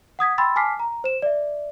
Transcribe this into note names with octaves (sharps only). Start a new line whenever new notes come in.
F#5 D#6 G#6 B6
G5 B5 C6 E6 A6
G#5 A5 D6 F6 B6 C7
A#5
C5 E7
D5 E5